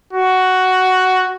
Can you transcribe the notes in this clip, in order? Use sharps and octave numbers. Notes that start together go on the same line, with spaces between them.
F#4